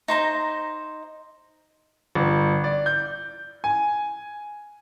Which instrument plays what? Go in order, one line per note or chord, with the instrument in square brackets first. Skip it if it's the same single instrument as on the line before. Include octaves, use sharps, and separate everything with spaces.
[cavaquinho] D#4 C5 A#5
[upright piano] G1
D5
G6
G#5